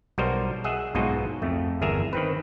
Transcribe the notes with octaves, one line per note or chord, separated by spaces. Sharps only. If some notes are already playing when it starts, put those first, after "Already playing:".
B1 G3 F#4 A#4 C5 D#5
G#4 D#5 E5 F#5
B1 G#2 B2 F4 F#4 D#5
F2 A3
G1 E2 G#4 A#4 E5 A#5
D#3 C4 B4